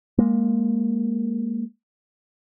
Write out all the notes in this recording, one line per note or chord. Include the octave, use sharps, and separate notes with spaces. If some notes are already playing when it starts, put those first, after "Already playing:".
G#3 A#3